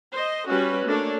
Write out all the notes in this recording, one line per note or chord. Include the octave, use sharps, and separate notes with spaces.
C5 D#5
G3 C#4 F#4 B4
A3 A#3 D4 A4 C#5